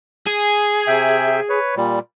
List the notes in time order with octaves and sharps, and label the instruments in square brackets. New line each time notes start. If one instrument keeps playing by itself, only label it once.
[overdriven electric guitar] G#4
[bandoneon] C3 E5 G5
B4 C#5
A#2 G3